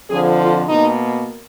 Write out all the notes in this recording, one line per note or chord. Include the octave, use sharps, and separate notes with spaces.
F2 D3 F3 G#4
F4
B2 A#3 D#4